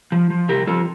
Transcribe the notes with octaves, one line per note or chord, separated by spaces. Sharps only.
F3
F3
C3 G4 A#4
F3 F4 A4